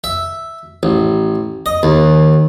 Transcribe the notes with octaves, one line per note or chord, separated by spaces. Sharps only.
E5
A1
D#5
D#2